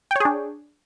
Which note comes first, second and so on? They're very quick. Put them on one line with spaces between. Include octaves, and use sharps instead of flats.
G5 C#5 G#4 D4